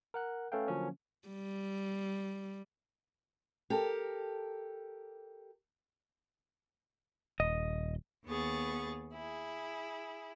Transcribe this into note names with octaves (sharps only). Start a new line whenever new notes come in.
A#4 F#5 F#6
A3 C#4 A4 B4 F5 G5
D3 F3 F#3 A#3 C#4
G3
G4 A4 A#4
D#1 D#5
D#2 B3 G#4 C#6 A6
E4 G#4